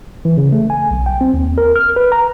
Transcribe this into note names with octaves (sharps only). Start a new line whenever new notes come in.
E3
C#3
A3
G#5
B1
G5
C4
D#2
A#4
F6
B4
A#5